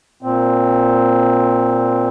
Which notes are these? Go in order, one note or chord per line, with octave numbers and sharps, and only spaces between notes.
A#2 C4